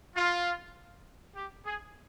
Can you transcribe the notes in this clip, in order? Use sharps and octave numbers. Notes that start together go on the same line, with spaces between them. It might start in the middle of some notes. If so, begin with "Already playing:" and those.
F4
G4
G#4